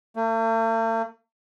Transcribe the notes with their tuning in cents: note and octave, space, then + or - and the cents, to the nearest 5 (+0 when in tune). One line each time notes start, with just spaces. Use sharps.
A3 +45